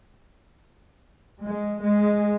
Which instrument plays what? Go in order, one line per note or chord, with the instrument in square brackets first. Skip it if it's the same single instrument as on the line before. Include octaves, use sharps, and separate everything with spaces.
[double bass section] G#3
G#3